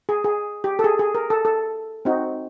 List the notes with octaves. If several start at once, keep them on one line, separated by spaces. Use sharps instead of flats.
G#4
G#4
G4
A4
G#4
G#4
A#4
A4
A4
C4 D#4 F#4